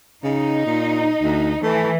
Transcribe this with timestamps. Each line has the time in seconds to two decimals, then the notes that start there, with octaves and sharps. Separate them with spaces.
0.24 C#3 D#4
0.66 A#2
1.23 D2
1.63 E3 A3